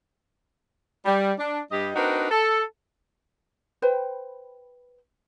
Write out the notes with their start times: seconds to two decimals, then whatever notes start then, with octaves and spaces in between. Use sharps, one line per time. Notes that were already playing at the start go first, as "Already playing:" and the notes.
1.06 G3
1.39 D4
1.71 G2 G3 G4 D#5
1.96 C4 D4 D#4 F#4 A#4 B4
2.31 A4
3.82 B4 C5 G5